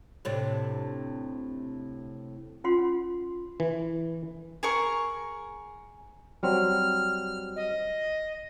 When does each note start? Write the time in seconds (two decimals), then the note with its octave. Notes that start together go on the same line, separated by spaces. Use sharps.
0.25 A2 C3 D4
2.64 C#4 F4 F#5 C6
3.60 E3
4.63 G#4 A#4 C#6
6.43 F#3 G3 C4 F6
7.56 D#5